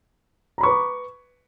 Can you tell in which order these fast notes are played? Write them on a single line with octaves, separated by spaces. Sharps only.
A#5 B5 C#6 B4 D6